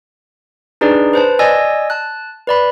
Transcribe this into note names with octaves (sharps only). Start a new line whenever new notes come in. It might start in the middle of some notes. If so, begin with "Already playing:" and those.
D4 D#4 G#4 B4 D5
B4 C5 A5
D5 D#5 G#5 E6 A#6
A5 F#6
B4 D5 B5